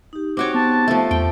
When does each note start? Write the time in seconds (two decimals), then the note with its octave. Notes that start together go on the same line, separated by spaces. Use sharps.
0.13 D#4 G4
0.37 C4 F#4 C#5 D6
0.54 B3 A5
0.88 F3 A3
1.11 E2 G5